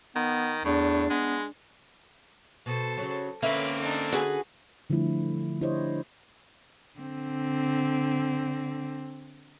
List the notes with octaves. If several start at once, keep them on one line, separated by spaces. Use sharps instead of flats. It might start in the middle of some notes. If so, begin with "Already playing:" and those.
D#3 B3
E2 A2 D4
G#3 B3
B2 A4 C5
C#3 F#3
D3 A#3 C4 C#4 B4 E5
D4 D#4
F#4 G#4 B4 G#5
D3 F3 G3 A3 E4
D4 E4 G4 C5 C#5 D#5
D3 C4